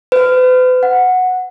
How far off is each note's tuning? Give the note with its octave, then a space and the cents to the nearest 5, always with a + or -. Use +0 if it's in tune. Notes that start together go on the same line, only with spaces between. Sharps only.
B4 +45
F#5 -10